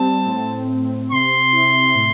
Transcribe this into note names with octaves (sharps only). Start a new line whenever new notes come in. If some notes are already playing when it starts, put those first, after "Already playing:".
Already playing: G3 C4 A5
A2
C4
C3 C6
E4
A2